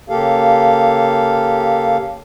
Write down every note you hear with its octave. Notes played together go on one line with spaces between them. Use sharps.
C#3 A#3 G4 A4 F5